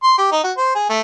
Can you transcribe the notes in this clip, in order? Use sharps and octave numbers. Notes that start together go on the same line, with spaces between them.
C6
G4
D#4
F#4
C5
G#4
A3